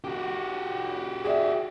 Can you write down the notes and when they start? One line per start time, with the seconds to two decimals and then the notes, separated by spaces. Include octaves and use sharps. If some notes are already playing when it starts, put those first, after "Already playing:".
0.04 F#4 G4
1.24 G#4 D5 E5